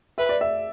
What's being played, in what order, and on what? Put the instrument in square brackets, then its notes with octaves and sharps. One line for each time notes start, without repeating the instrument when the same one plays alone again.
[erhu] B4 [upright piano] E5
[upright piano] D5
E5